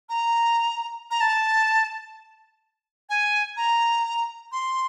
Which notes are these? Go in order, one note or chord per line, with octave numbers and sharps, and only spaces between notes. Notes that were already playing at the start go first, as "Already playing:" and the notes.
A#5
A#5
A5
G#5
A#5
C6